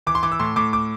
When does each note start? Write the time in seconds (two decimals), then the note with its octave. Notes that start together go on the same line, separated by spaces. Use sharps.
0.07 E3 D6
0.15 C6
0.23 E3 D6
0.32 E6
0.40 A2 C6
0.56 A2 D6
0.73 D6